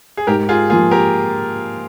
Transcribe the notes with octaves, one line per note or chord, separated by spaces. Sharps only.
G#4
G#2 G4 A#4
F4 G#4
F3 A#3 F4 G#4
G4 A#4